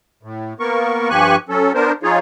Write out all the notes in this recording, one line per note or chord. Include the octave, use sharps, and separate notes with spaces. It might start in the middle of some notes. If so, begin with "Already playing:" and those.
A2
A#3 B3 A#4 C#6
G2 F3 G4 G#5 C#6 F#6
F#3 C#4 A4
B3 D4 A#4 C5
F3 D#4 F4 G#4 C#5